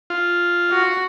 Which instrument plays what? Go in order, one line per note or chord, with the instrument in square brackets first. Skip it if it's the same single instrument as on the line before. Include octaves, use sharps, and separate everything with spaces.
[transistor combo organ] F4
[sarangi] F#4